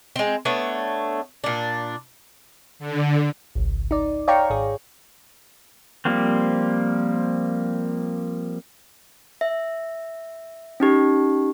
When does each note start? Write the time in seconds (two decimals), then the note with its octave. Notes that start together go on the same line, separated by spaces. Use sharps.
0.16 G#3 C4
0.45 A3 B3 D4 C#5
1.44 A#2 D4
2.79 D3
3.55 G#1 C#2
3.91 D#4 D5
4.28 C#5 D5 F5 G5 A#5 C#6
4.50 G#1 G#4
6.05 F3 G3 A#3 C4
9.41 E5
10.80 C#4 D#4 G4